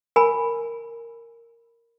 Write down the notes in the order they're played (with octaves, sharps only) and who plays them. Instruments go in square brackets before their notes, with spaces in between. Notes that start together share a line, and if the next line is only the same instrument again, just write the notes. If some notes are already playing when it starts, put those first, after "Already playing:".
[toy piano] A#4 G#5 B5